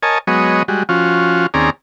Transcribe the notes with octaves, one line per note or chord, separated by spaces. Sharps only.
A#4 C#5 D#5 G#5 A5
F#3 G#3 B3 C#5 D#5
G3 G#3 F#4
F3 C#4 F4 F#4
D#2 C4 C#4 G#4 D5 A#5